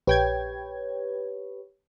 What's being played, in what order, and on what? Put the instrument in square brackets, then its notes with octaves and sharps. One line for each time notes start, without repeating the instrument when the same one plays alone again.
[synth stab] A#1 G5 G#6 [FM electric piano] G4 B4 C#5